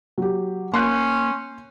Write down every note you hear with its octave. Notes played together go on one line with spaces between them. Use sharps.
F#3 G4
A#3 C#4 C6 F#6 G6